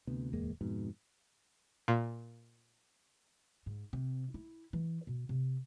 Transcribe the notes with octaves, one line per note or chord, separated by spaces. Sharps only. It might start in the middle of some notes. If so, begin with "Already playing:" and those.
D2 C3 B3
D1 E2 G#3 A#3
F2 G#2 B2
A#2
G#2
C3
E4
E3
B2
C3